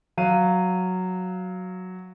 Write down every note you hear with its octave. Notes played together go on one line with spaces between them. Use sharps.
F#3 F5 D#7